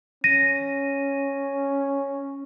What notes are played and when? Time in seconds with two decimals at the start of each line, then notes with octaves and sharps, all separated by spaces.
0.24 C#4 A#6 D#7